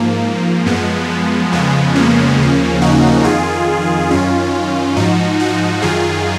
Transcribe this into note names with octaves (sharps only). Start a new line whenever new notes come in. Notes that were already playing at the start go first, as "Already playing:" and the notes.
Already playing: G#2 F3 A#3
F#2 F3 G#3 B3
F2 C#3 F3 G#3 B3
A#3 C#4
D#2 C#3 F3
D#4 F#4
F2 D#3 F4 G#4
F#2 D#3 C#4 F4
G#2 F3 D#4 F#4
D#4 F#4
F#2 D#3 F4 G#4